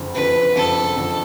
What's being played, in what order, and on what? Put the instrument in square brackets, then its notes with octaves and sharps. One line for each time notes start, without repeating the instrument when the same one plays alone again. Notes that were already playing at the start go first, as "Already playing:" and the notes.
Already playing: [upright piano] F#1 F2 D3
[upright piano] F#1 F2 D3 [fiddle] B4
[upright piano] F#1 F2 D3 [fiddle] A4
[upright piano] F#1 F2 D3